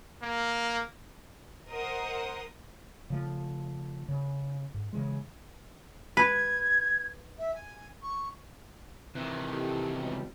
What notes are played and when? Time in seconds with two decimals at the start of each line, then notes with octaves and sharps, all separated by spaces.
0.22 A#3
1.69 A#4 C5 D#5 F#5 D#6
3.10 C#3 F3 A3
4.09 C#3
4.74 G#2
4.93 C#3 E3 G#3
6.17 B4 G#6
7.38 E5
7.54 G#5
8.02 C#6
9.15 C3 D#3 E3 C4
9.50 E4 G4 A4
9.96 C#2 B2 G3